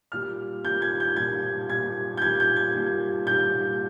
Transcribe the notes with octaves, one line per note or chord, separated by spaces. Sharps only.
A#2 G3 F6
A#2 G3 G6
G#6
G6
A#2 G3 G#6
A#2 G3 G#6
G6
A#2 G3 G#6
G6
G#6
A#2 G3
A#2 G3 G6